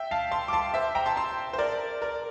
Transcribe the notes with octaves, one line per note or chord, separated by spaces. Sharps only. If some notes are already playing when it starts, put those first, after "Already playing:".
Already playing: E5 G5
F5 A5
A5 C6
D6
A5 C6
C5 E5
G5 A#5
A5 C6
A5 C6
C5
A#4 D5
A#4 D5